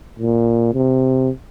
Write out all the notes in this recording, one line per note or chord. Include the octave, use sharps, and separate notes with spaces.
A#2
C3